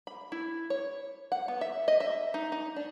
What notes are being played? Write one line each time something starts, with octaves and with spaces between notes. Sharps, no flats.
B5
E4
C#5
F#5
B3
E5
D#5
E5
D#4
D#4
D4